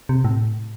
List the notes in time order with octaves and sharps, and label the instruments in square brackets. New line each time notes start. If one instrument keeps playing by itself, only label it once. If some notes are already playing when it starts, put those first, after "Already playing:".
[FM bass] C3
A2